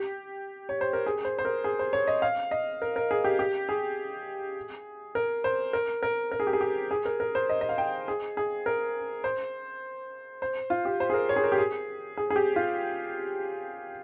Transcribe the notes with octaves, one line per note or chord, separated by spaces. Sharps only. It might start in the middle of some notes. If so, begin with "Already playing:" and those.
Already playing: G4
C#5
C5
A#4
G#4
C5
C5
A#4
G#4
C5
C#5
D#5
F5
D#5
A#4
A#4
G#4
G4
G4
G#4
A#4
C5
A#4
A#4
A#4
G#4
G4
G#4
G4
G#4
A#4
A#4
C5
D#5
D#5
F5
G5
G#4
G#4
A#4
C5
C5
F4
G4
C5
G#4
A#4
C#5
G#4
A#4
G4
G#4
G#4
G#4
G4
F4